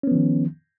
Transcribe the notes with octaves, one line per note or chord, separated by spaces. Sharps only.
D#3 F3 B3 C#4